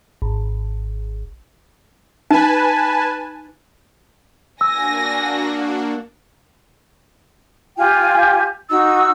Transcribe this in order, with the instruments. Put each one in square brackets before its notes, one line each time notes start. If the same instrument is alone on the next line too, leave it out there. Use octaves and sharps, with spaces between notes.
[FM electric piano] G#1
[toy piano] D#4 [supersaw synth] B4 G#5 A5
[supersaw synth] A#3 D4 F#4 [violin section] G#5 A#6 [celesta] E6
[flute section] F4 G4 G5 G#5
D#4 F#4 E6